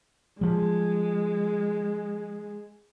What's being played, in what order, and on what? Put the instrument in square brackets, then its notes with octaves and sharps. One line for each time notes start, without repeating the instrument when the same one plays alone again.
[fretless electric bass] F3 G3 [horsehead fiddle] G#3